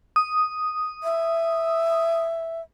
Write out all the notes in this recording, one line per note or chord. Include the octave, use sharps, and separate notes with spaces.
D#6
E5